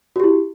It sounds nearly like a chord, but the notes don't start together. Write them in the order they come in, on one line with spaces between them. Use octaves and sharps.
F#4 G4 E4